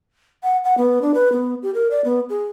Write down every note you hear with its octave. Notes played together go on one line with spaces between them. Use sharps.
F#5
F#5
B3
D4
B4
B3
G4
A#4
D5
B3
G#4